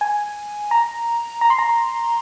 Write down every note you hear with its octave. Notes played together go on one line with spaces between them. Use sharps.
G#5
A#5
A#5
C6
A#5